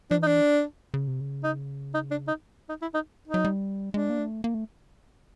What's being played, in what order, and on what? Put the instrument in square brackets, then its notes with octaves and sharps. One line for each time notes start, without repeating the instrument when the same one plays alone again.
[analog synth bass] F3 [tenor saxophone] D4
[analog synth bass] E3 [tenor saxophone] D#4
[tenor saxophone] D4
[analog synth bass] C#3
C3
C#3
[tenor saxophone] D#4
D#4
D4
D#4
D#4
E4
D#4
D#4
[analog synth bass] F#3
G3
[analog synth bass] G#3 [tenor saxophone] D4
[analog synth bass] A#3
A3
A#3
A3